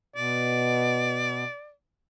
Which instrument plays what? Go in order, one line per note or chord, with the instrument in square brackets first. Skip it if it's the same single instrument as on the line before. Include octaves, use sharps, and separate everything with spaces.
[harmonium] B2 [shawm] D5